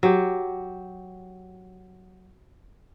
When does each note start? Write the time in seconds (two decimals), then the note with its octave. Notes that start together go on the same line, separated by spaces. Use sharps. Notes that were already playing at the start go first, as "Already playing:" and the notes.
0.03 F#3 G4